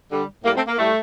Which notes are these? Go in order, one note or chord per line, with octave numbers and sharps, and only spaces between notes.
D3 G3
A2 G3 A#3
A3 C4
A#3
A2 G3 A3